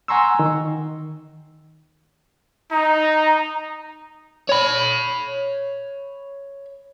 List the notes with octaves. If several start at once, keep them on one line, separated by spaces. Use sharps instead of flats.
F#5 G#5 A#5 C6 C#6 E6
D#3
D#4 A#5
C#5 B5